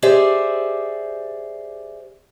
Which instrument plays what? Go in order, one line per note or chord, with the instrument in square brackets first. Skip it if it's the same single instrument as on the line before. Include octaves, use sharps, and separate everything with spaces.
[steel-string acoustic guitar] G4 G#4 C5 D5 E5